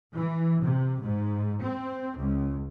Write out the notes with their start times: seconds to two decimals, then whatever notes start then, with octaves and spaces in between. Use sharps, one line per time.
0.13 E3
0.63 C3
1.03 G#2
1.63 C4
2.19 C#2